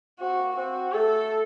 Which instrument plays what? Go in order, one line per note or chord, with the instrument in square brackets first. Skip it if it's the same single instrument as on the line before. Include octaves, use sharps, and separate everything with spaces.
[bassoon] C4 [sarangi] F#4
[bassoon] A#3
[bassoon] C4 [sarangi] F#4
[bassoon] A3 [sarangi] A4